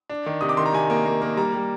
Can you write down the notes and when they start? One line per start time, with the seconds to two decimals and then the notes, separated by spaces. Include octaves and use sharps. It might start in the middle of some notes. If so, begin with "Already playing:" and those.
0.10 D4
0.26 D#3
0.41 C3 D#6
0.49 D6
0.57 D#3 C6
0.66 A#5
0.73 C3 G#5
0.90 A#3
1.06 A#3
1.22 A#3
1.37 G3 A#5
1.54 G3